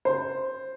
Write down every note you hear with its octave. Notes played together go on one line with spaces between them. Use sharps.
C5